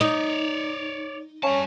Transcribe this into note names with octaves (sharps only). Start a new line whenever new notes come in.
D#4 C#5 D5
G3 C#4 A5